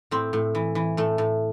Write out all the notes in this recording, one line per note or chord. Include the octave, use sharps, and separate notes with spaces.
A2 C4
A2
E3
E3
A2 A3
A2